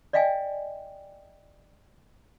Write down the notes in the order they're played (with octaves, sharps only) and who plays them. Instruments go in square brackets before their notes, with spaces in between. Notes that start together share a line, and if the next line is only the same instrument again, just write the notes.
[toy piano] D5 D#5 F5 G5 G#5